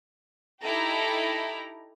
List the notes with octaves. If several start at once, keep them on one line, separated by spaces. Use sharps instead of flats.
D#4 E4 G4 A4 A#5